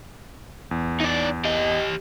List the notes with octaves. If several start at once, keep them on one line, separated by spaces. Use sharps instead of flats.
E2
D#4 D5
G4 D#5